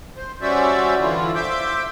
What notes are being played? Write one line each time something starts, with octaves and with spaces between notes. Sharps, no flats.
C5
G3 C#4 F#4 C5 D5 E5
D3 E3 E4 F4
C5 E5 D6 G6